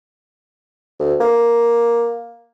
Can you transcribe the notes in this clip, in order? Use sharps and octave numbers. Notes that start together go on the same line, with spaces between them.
D2
A#3